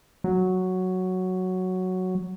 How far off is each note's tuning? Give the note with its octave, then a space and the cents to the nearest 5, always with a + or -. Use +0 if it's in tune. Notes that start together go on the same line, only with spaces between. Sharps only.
F#3 +0